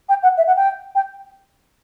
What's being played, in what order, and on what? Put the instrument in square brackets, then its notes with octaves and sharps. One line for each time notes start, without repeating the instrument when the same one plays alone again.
[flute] G5
F#5
E5
F#5
G5
G5